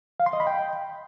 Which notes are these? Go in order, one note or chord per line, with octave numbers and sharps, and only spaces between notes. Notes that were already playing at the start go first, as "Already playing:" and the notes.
F5
C6
D#5
B5
G5